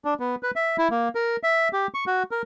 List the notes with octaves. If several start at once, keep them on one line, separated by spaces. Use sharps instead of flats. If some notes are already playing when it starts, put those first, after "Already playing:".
D4
B3
B4
E5
E4
A#3
A#4
E5
G4
C#6
F#4
A#4